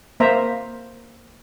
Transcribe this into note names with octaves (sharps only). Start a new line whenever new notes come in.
A#3 C5 E5 A#5